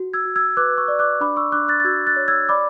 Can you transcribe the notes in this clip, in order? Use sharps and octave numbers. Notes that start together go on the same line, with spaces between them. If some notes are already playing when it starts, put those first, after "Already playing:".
Already playing: F#4
E6 G#6
F#4
E6 G#6
B4 D6 F#6
C#6 E6
D5
D6 F#6
D4 B5 D6
C#6 E6
D4 D6 F#6
F#6 A6
A6
F#4 E6 G#6
F#6 A6
C#5
E6 G#6
D5 B5 D6